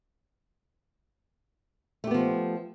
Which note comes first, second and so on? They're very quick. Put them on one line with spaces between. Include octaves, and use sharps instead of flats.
A3 G4 B3 F3